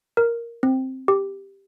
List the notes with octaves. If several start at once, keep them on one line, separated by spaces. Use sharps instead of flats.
A#4
C4
G4